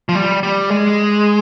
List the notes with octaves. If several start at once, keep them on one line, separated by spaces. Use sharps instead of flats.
F3
G3
G3
G#3